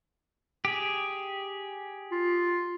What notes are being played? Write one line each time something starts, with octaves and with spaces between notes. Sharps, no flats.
G4 G#4
F4